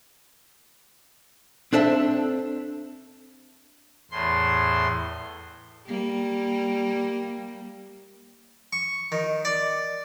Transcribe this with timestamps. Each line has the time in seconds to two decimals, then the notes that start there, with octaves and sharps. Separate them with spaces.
1.73 C4 D4 A4 E5
4.11 E2 A2 C6
5.86 G3 A#3
8.73 C#6
9.12 D#3
9.45 D5